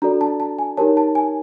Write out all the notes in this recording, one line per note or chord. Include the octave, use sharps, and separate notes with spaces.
D4 F#4 A4 D5 A#5
A5
A5
G#5
D#4 G4 A#4 C#5 A5
A5
G#5